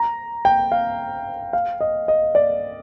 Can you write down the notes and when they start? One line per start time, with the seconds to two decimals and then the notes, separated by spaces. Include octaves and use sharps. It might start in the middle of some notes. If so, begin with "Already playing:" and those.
Already playing: A#5
0.45 G5
0.72 F5
1.53 F5
1.81 D#5
2.08 D#5
2.35 D5